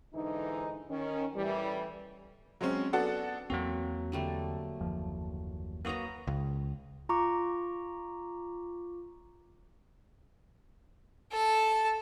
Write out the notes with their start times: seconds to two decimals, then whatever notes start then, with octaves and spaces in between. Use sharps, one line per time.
0.14 G#2 D3 E3 D#4
0.90 D#3 C#4
1.35 A2 E3 G3
2.61 F#3 G#3 C4 C#4
2.93 B3 D4 F#4 A4 F#5
3.50 E2 F#3 A#3 C4 F#4
4.12 D3 G3 A3
4.81 F#1 D#2 F3
5.85 A#3 F#4 B4 C#5 A#5 D#6
6.27 C#2
7.09 F4 A#5 C#6 D6
11.32 A4 A5